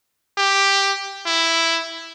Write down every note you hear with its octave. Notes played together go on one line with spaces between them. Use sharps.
G4
E4